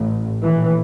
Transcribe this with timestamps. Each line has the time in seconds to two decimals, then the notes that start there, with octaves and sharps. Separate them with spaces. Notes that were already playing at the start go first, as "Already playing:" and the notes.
Already playing: A1 A2
0.44 A#1 A2 E3